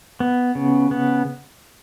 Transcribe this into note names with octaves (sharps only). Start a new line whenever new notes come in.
B3
C#3
B3